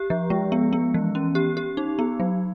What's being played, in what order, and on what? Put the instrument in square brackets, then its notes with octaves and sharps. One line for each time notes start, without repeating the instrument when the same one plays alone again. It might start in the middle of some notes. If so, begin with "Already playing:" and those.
Already playing: [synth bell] G4
F3
G#3
B3
B3
E3
C#4
G4
G4
D#4
B3
F#3